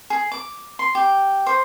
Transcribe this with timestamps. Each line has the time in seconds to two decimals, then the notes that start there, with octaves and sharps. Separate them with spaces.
0.10 G#4
0.32 D6
0.79 C6
0.95 G4
1.46 C5